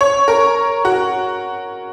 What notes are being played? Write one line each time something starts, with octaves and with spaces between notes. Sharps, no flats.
C#5
A#4
F#4